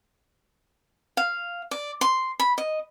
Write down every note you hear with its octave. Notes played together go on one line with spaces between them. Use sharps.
F5
D5
C6
B5
D#5